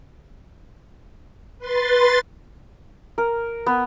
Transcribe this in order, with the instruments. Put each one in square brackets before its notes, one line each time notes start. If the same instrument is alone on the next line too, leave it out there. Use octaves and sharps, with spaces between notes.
[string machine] B4 C6 A6
[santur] A#4
B3